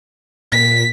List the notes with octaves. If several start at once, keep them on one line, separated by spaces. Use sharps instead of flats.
A#2 B6